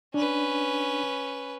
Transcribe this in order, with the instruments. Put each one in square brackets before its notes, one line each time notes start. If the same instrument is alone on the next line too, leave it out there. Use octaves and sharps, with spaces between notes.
[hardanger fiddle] C#4 B4 [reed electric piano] D4